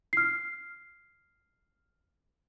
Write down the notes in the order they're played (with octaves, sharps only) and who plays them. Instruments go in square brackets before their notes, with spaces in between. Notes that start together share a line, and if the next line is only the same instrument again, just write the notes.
[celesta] F6 C7